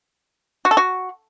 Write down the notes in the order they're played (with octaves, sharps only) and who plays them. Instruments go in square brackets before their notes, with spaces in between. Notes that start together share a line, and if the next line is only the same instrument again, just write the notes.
[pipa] F#4
A4
F#4